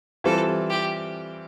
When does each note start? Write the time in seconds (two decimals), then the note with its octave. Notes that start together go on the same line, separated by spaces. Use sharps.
0.24 E3 G3 C4 F4 A4
0.70 G4